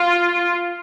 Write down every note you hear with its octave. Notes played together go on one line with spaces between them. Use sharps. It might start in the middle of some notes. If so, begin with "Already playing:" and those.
Already playing: F4